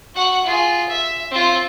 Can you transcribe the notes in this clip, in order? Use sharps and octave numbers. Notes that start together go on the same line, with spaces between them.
F#4 F#5
F4 G#4
E5
C4 F4